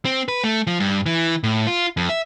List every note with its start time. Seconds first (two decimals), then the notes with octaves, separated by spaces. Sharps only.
0.05 C4
0.28 B4
0.44 A3
0.67 F3
0.80 G2
1.06 E3
1.44 A2
1.67 F4
1.97 F2
2.09 E5